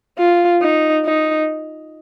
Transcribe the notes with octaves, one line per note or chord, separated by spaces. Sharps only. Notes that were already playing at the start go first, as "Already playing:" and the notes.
F4
D#4
D#4